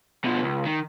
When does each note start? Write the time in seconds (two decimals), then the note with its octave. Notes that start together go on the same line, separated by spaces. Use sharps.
0.25 B2 F3
0.43 C#2
0.66 D#3